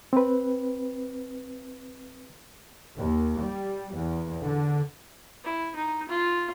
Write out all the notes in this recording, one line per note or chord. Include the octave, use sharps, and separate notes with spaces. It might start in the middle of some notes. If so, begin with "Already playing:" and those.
C4 B4
D#2
G3
E2
D3
E4
D#4
F4